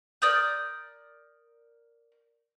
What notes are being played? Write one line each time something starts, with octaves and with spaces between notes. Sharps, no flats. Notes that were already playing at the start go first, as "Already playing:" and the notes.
A#4 D5 D#6 G6